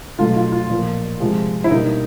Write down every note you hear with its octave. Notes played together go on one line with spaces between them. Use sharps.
B2 F#3 A3 F4
F4
F4
A#2 F3 A#3
C3 F3 G#3
E4
B2 G3 A#3 D#4